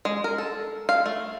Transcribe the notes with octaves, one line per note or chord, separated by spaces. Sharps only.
G#3
A#4
A4
F5
A3